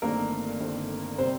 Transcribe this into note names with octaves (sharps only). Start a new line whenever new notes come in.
G1 G2 D#3 A3 A#3 C4 A#4
G1 G2 D#3 A3 C4
C3 G3 C4 C5